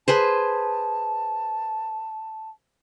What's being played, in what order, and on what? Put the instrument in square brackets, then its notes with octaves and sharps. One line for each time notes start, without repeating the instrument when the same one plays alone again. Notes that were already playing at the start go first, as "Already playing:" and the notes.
[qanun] G#4 B4 C5 [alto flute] A5